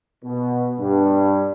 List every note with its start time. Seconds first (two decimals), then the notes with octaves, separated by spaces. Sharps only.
0.23 B2
0.78 G2